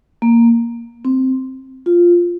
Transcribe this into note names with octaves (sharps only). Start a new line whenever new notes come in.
A#3
C4
F4